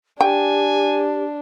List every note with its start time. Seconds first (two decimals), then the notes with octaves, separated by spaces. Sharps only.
0.21 D4 G4 G5 G#5